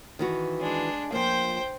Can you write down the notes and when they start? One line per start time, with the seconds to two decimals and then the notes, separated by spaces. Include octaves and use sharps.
0.19 D#3 E3 F#4
0.60 G#3 D4
1.12 F3 A#3 C5 G5